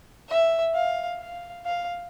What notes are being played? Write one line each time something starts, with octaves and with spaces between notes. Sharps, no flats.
E5
F5
F5
F5